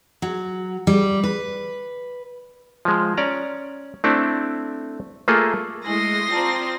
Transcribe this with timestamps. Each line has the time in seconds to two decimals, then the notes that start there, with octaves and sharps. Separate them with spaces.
0.22 F#3
0.87 G3
1.24 B4
2.85 F3 G#3
3.17 C#4 D5 A#5
4.04 A3 C4 D4 E4 A4
5.28 A3 A#3 F4 G#4 A4
5.86 G#3 A3 E4 G#5 C6 D#6 A#6
6.32 C4 F4 D5 A5 A#5